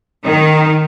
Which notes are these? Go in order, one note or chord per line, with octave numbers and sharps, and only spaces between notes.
D#3